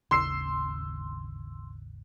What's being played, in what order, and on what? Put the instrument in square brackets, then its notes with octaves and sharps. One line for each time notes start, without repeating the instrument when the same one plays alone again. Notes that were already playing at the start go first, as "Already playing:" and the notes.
[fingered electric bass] G#1 D#2 C#3 [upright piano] C6 E6 C7